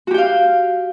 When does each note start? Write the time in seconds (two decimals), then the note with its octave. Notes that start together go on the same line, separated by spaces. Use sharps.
0.07 F#4
0.11 G4
0.14 G5
0.18 F5